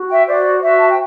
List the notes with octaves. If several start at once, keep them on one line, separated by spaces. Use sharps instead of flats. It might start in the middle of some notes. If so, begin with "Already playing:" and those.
Already playing: F#4
E5 G5
F#4 C5 D5
F#4 C5 E5
A5
G5